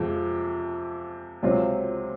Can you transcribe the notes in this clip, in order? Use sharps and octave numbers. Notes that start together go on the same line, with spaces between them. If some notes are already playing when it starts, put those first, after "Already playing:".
Already playing: F2 C3 F3 G#3
C#2 C3 F#3 C4 F4